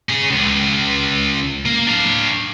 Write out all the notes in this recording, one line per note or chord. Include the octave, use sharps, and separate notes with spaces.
C#4 G#4
C#2
A#3
D4 F5